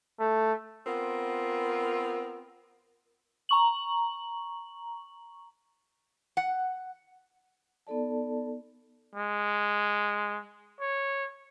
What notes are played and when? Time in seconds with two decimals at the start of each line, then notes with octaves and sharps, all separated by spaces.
0.20 A3
0.86 B3 C4 F4 A#4
3.49 A#5 C#6 F#7
6.37 F#5
7.87 B3 D#4 A4 D5 A5
9.15 G#3
10.80 C#5